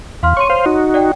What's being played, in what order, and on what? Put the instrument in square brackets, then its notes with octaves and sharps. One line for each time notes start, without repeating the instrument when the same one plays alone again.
[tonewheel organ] E2 [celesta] F5 C6 F6
[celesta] C#5 C6 D#7 [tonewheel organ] C#6
[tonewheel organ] C5 F5
D#4 F#4
[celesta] D5 F#5 G5